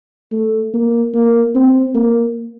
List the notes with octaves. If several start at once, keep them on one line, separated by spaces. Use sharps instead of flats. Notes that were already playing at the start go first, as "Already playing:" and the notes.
A3
A#3
A#3
C4
A#3